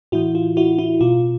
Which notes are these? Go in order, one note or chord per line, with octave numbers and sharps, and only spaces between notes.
A2 E3 E4 F#4
F4
E4 F#4
E4
B2 F4